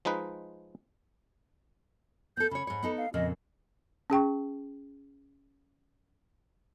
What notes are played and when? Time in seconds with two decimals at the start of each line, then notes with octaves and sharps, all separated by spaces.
0.05 F3 G#3 D#4 B4
2.37 B3 A4 G6
2.51 C#3 C#5 B5
2.67 G#2 C#5
2.83 B3 D#4 A4
2.98 F5
3.14 F2 A#2 C#3 D#5
4.10 C#4 G#4 G5 C#6